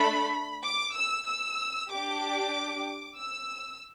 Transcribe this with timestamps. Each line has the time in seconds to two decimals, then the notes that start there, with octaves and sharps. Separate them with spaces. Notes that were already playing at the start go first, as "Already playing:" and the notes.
Already playing: A3 D4 A4 B5
0.64 D6
0.95 E6
1.27 E6
1.91 D4 G4 D6
3.18 E6